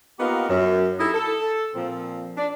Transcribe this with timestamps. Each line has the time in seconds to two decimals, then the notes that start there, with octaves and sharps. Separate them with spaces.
0.19 A#3 B3 D#4 F4 G4 A#4
0.48 F#2
1.00 D#4 E4 G4 A4 D#5 E5
1.14 A4
1.75 A#2 F3 C4
2.37 D4